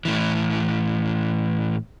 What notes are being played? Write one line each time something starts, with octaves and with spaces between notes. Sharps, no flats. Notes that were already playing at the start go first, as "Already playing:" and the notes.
A2 E3